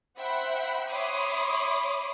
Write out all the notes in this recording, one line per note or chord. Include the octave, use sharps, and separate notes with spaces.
C5 E5 F#5 G5 B5
C#5 E5 B5 C6 D6 D#6